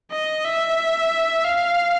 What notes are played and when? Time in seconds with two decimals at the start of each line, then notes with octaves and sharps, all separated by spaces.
0.11 D#5
0.45 E5
1.45 F5